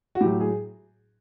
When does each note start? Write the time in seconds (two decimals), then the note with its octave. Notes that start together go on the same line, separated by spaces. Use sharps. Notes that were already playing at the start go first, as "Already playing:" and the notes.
0.15 F#4
0.21 A2 F#3 G4
0.41 G#4